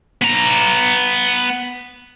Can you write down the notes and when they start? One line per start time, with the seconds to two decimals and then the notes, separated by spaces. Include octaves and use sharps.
0.22 B3 A#5